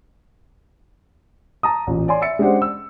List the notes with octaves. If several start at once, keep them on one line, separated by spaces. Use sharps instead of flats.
A5 A#5 D#6
A1 A#2
C#5 D5 G#5 C6
E5 E6 A6 C#7
G#3 C#4 D4 G4 C5 F#5
E6